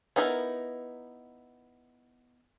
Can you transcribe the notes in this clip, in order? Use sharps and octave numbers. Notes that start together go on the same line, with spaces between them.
B3 D#4 E4 A#4